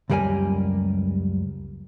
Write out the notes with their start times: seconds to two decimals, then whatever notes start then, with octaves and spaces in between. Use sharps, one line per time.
0.10 C#2 F#2 G3 A#3 G4 G#5